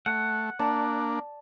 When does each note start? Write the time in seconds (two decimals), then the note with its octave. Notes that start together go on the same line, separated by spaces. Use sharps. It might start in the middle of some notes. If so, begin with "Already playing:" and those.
0.06 A3 F#5
0.59 A#3 D4 D5 A5 A6